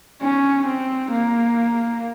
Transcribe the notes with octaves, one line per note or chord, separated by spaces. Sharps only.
C#4
C4
A#3